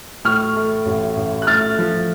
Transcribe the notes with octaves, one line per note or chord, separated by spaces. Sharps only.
A2 C#6 F6
A3
A1
A1
F#6
A3 F6 A6
F3